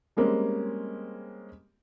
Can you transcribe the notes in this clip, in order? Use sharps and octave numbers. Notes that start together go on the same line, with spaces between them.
G3 G#3 A#3 C4 C#4